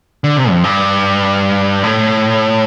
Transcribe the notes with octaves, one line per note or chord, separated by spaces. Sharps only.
D3
C3
F2
G2
A2